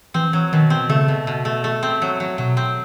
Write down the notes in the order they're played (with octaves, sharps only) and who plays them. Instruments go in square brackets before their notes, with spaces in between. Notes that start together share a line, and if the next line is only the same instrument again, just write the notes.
[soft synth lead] E3 [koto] C4
[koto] F#3
[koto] B2 [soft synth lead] D#3
[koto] C4
[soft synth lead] C#3 [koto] A3
[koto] B2
B2
A3
A3
C4
F#3
F#3
[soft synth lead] B2 [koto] F#3
[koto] C4